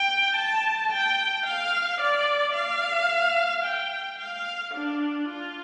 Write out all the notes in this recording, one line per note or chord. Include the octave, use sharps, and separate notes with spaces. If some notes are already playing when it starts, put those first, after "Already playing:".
Already playing: G5
A5
G5
F5
D5
F5
G5
F5
D4
F4